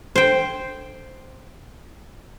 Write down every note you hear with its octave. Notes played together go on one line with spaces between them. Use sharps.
C5 G5